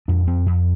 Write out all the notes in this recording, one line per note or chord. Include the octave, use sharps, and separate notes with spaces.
F2 D4
F2 C4
F2